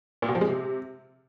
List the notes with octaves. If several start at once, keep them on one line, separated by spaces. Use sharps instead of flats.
A#2
B2
F3
G#3
C3